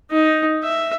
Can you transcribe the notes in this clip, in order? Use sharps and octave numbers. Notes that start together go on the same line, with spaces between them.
D#4
E5